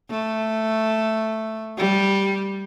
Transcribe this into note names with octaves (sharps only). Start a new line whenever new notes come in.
A3
G3